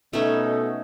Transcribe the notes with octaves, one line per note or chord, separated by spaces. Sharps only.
B2 A3 C#4 D#4 A4